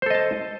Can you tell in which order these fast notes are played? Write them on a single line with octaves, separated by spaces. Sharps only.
C5 A4 D#5 A5